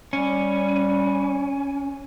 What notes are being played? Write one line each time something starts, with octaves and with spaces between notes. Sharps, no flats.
G3 C#4